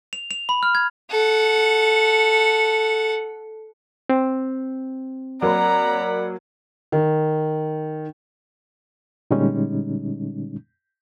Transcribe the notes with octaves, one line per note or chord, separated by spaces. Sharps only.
F7
F7
B5
F6
G#6
A4 F#5
C4
F#3 A#3 D5 F#5 A#5 B5
D#3
A#2 D3 G3 G#3 C#4 D#4